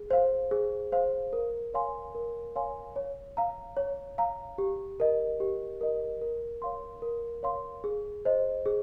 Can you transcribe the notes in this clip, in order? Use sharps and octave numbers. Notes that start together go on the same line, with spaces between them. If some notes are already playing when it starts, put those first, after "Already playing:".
Already playing: G#4
C5 F5
G#4
C5 F5
A#4
C#5 F5 G#5 C6
A#4
C#5 F5 G#5 C6
C#5
F5 A#5
C#5
F5 A#5
G4
A#4 D#5
G4
A#4 D#5
A#4
C#5 F5 C6
A#4
C#5 F5 C6
G#4
C5 D#5
G#4